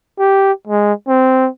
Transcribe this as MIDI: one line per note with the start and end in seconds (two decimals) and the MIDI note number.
0.19 0.52 67
0.67 0.93 56
1.08 1.49 60